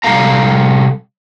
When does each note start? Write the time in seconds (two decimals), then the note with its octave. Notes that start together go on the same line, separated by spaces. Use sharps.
0.04 C3 G3 D#4 A4 F5 A#5